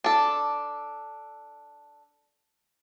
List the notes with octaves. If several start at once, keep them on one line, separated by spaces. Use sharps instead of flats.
D4 A4